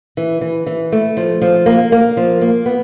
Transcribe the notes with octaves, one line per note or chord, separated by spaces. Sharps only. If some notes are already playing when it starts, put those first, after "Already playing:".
E3
E3
E3
A3
F3
F3
A#3
A#3
F3
A#3
B3